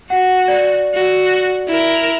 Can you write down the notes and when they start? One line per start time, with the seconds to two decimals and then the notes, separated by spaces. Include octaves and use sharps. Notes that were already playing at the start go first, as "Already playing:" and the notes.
0.10 F#4 F#5
0.48 D5
0.94 F#4
1.68 E4 A#4